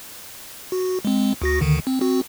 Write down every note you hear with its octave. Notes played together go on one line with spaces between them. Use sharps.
F#4
G#3 C4
D2 F#4 A#6
D2 D3 D#3
C4
C4 F#4